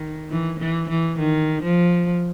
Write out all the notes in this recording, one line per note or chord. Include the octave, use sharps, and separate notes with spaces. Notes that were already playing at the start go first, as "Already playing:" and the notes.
Already playing: D#3
E3
E3
E3
D#3
F3